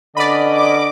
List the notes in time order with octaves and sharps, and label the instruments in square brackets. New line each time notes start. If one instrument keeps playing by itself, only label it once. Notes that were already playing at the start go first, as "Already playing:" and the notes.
[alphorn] D3 [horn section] C#4 B4 D#5 [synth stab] D5 B5
[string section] D6